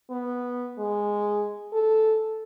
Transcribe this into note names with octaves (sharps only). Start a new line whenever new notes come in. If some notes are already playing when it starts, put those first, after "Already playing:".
B3
G#3
A4